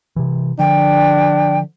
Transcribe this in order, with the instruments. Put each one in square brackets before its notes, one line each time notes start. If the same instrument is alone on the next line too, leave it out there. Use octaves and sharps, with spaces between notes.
[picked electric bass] C3 E3
[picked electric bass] D3 F3 [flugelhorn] D4 [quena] G5